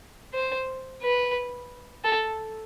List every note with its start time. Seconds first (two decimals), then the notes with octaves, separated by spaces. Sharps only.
0.34 C5
1.02 B4
2.04 A4